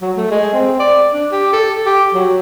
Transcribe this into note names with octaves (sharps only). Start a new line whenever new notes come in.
F#3
A3
G#3
C4
D5
D4
G4
A4
G4
F#3